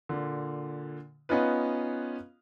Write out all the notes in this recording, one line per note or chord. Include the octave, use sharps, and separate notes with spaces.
A#2 D3
B3 C#4 D#4 F4 B4